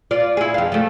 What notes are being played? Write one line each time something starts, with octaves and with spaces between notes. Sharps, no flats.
F4 D5
E4 G#4
F2 F5
F3 A3